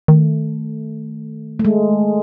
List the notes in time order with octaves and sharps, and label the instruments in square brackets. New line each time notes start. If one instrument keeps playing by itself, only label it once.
[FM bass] D#3 [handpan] A3
[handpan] A3
G#3